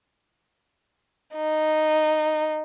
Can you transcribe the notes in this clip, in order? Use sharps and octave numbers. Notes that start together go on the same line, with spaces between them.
D#4